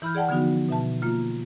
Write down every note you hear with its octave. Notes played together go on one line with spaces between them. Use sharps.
E3 E4 B5 F6 G6
G#4 D5 F#5 G5 A5
D3 F3 B3 D#4 F#4
B2 E5 A5
A#3 F4